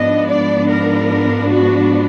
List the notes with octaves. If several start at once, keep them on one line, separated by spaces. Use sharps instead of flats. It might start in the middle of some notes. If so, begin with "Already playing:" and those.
Already playing: G#2 F3 B3 D4 D#5
D5
A#4
F#4